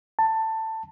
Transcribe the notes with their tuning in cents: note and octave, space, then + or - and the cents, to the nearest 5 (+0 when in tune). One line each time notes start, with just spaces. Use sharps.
A5 +15